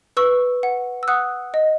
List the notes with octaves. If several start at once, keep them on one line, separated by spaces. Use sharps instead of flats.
B4 C#6 E6
F#5
E6
F#5 D#6 F#6
D#5